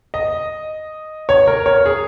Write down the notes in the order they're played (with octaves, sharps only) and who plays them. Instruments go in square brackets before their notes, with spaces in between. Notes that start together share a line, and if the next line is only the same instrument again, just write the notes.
[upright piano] D#5
C#5
A#4
C#5
G#4